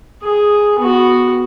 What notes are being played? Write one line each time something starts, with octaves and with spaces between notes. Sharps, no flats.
G#4
B3 F#4